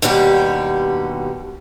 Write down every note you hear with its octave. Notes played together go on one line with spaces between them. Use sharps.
D#2 B2 D3 G3 G4